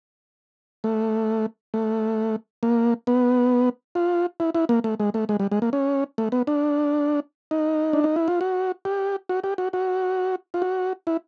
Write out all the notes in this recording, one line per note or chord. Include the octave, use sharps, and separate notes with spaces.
A3
A3
A#3
B3
F4
E4
E4
A#3
A3
G#3
A3
G#3
G3
G#3
A#3
C#4
A3
B3
D4
D#4
D4
D#4
E4
F4
F#4
G4
F#4
G4
F#4
F#4
F4
F#4
E4